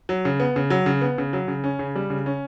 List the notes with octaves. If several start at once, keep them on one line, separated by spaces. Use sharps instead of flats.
F#3
C#3
B3
C#3
F#3
C#3
B3
C#3
F#3
C#3
C#4
C#3
G3
C#3
C#4